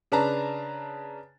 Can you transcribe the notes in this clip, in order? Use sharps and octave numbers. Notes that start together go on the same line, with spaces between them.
C#3 D4 B4 A5 A#5